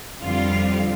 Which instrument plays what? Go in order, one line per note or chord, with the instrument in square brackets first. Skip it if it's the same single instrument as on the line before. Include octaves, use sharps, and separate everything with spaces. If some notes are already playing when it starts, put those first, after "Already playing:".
[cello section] F2 D3 G3 C4 F4 F5